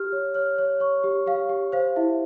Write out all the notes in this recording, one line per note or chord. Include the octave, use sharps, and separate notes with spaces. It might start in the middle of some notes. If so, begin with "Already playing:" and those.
Already playing: G4 F6
C#5
C#5 F6
C#5
C#5 C#6
G4
G4 F5
G4
C5 F5
E4 E5